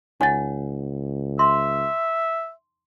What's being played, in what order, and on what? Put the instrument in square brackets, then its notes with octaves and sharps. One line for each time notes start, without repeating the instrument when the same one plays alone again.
[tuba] C#2 [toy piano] D#4 C#5 F#5 [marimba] G#5 A6
[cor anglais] E5 [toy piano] C6